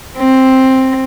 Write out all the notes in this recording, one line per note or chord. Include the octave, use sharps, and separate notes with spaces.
C4